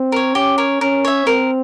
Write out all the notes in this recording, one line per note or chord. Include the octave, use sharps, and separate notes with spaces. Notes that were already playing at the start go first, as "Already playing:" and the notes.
Already playing: C4
A#4 C#5
C#4 G4
A#4 C#5
C#4 A#4
C#5 E5
C4 A#4